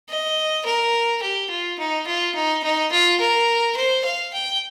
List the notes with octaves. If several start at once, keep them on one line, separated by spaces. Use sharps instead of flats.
D#5
A#4
G4
F4
D#4
F4
D#4
D#4
F4
A#4
C5
F5
G5